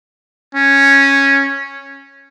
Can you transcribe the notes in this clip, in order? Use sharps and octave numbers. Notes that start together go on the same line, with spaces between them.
C#4